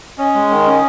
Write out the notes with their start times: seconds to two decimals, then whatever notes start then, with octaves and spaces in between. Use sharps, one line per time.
0.18 C#4 D#5
0.34 G#3
0.50 D#3
0.66 C#4